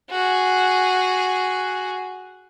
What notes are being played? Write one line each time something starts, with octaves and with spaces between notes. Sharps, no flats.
F#4 G#4